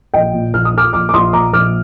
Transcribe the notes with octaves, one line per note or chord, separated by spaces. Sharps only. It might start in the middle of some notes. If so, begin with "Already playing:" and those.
A#1 D#5 G5
A#2
A#1 F6
D#6
F3 D6 F6
A#1 D6 F6
D6
A#1 C6 D#6
A#2 A#5 D6
A#1 D6 F6